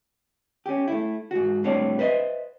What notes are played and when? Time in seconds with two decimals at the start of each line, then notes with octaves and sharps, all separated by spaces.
0.66 C#4 G4
0.88 A3 E4
1.31 G#2 F#4
1.64 A2 G3 C4 D4 C#5 D5
1.99 B4 C5 D#5 E5